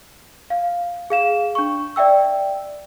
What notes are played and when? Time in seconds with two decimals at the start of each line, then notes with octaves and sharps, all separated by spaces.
0.50 F5
1.10 G#4 F5 E7
1.55 D4 C#6
1.96 D5 E5 G5 E6